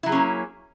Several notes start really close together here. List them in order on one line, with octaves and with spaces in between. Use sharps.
E4 F#3 G#4 C#4 A#3